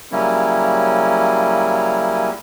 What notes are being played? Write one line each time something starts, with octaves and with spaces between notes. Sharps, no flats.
C#3 F#3 G3 A#3 C#4 E4